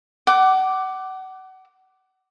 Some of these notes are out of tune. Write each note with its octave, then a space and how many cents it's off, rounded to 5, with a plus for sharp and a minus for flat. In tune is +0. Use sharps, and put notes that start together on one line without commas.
F#5 +30 D6 +0